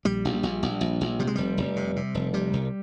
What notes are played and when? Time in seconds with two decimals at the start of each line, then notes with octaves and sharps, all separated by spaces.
0.05 A#1 G3
0.25 A#1
0.43 A#1
0.63 A#1
0.81 A#1
1.01 A#1
1.19 C3 G3
1.27 G#3
1.35 F1 G3
1.58 F1
1.76 C3
1.96 C3
2.15 F1
2.33 C3 G3
2.53 C2